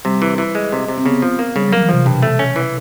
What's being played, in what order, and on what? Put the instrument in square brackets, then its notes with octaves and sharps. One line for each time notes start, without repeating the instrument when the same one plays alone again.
[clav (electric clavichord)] C3 [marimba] G3
[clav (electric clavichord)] E3
E3
G#3
C3
C3
[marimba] C4
[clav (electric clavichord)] C#3 [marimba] B3
[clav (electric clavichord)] F3
A#3
[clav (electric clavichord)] C#3 [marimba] G3
[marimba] F#3
[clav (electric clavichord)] A#3
[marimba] E3
[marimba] C3 [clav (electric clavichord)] F3
[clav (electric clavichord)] G2 [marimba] B2
[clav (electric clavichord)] A3
C#4
E3